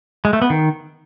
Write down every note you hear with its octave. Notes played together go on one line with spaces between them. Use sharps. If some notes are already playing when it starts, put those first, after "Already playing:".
G#3
A3
B3
D#3